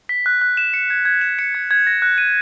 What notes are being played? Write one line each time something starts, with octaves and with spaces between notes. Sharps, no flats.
B6
F#6
F#6
E7
C#7
G#6
G#6
E7
C#7
G#6
G#6
A#6
F#6
D#7